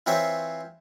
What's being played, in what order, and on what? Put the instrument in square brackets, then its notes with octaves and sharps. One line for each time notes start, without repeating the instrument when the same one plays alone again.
[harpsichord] E3 C4 F4 C5 C#5 E5